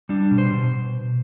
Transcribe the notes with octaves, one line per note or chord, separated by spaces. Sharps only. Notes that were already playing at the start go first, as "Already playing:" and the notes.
G3 D4
B2
C5
B2